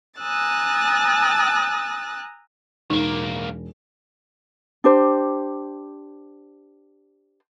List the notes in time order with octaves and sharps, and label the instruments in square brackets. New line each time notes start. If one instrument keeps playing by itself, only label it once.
[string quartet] G#5 A#5 D#6 E6 F#6 A6
[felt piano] E1 [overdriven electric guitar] B1 A#3 [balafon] D#4
[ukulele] D4 G4 C5